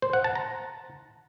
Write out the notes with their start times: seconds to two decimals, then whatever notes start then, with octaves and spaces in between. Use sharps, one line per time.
0.02 C5
0.13 F#5
0.24 A5
0.35 A#5